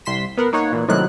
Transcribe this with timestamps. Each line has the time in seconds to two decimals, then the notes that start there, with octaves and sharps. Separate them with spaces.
0.05 C2 C6 B6 E7
0.37 B3 A#4 F#5
0.53 A#3 D#4 C#5 F#5
0.72 A#2 E3
0.88 A2 C3 D#3 F#3 F#6